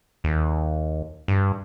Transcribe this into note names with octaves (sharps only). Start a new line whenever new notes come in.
D#2
G2